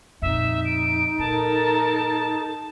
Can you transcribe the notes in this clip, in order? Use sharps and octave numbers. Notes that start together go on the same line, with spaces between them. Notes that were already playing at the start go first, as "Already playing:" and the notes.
F2 A#2 D#4 E5
D7
A#2 A4 A#4 A5